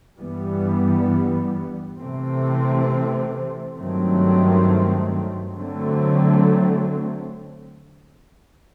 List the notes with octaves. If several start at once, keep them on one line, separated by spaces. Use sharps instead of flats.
G2 E3 G3 B3
C3 E3 A3 C4
G2 D#3 F#3 A3 C4
D3 F#3 A3 C4